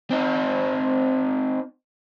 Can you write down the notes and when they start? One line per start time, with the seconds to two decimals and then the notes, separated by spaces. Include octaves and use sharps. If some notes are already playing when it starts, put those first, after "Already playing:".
0.11 C4 D#4